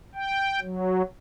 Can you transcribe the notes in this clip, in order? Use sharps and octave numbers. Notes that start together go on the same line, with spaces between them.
G5
F#3